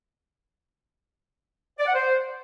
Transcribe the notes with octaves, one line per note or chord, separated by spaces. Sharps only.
D5
F#5
C5